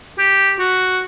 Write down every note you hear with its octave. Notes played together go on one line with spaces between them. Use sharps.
G4
F#4